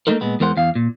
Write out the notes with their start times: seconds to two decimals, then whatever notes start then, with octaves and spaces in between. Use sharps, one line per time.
0.07 A3 A#3 D#4 A4 A#4
0.21 A#2 G#3 B3
0.40 E2 G#3 A#4 C5 F#5
0.57 E2 F5
0.75 A#2